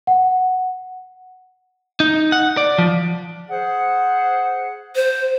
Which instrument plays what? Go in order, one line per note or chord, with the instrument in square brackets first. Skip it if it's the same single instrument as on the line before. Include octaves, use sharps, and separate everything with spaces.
[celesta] F#5
[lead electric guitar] D#4
F#5
D5
F3
[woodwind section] G#4 C5 F#5
[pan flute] C5